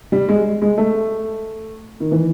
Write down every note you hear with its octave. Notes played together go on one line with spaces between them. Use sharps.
G3
G#3
G#3
A3
D#3
E3